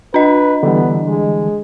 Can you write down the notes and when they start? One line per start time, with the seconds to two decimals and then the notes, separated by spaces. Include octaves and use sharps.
0.14 D4 B4 D#5
0.63 D3 E3 G3 B3
1.08 G#3